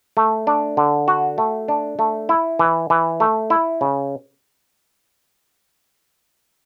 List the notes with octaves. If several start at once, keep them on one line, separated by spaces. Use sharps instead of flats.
A3
D4
D3
F#4
A3
D4
A3
E4
E3
E3
A3
E4
C#3